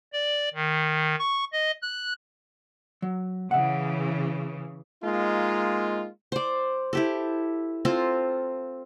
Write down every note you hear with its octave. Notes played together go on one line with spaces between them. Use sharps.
D5
D#3
C#6
D#5
F#6
F#3
C#3 E3 E5 F#5
G#3 A#3 D#4 F4
C5 D5
E4 G4 A4
C4 F4 A4